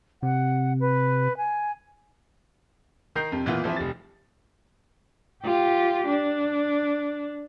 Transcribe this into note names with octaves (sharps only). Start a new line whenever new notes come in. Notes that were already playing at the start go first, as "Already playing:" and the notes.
C3 F#5
B4
G#5
D#3 A#4 A#5 G6 C7
F2 C3
A#2 E3 A#3 B3 F4
E3 F3 C4 E4
F1 G3 A6
F4 G4
D4